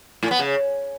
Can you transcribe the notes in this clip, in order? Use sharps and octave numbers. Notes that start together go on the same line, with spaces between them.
A2
B3
C#3